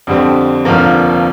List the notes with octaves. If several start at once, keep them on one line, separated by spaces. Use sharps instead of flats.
F2 D3 G3 C4
F1 D#2 D3 F3 A#3